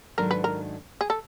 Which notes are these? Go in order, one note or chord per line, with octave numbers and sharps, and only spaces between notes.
G#2 D#3 F#3 A3 D4 A#4
B4
A#4
G#4
A4